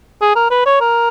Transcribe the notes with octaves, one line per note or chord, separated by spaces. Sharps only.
G#4
A#4
B4
C#5
A#4